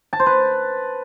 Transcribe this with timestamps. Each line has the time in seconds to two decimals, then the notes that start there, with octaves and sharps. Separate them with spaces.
0.13 A5
0.20 C5
0.26 B4